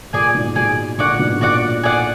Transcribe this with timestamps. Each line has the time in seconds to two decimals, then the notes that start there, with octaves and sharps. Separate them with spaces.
0.13 A#2 G#4 D5 G#5
0.35 G#2 B2
0.56 G#2 B2 G#4 D5 G#5
0.98 A#2 D3 F#4 D5 F#5
1.19 G#2 B2
1.41 A#2 F#4 D5 F#5
1.83 G#4 D5 F#5